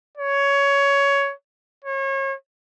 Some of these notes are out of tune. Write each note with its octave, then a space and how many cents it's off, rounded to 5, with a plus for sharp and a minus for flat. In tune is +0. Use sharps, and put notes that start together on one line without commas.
C#5 +15
C#5 -35